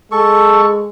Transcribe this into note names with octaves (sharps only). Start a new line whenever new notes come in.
G#3 A4 C#6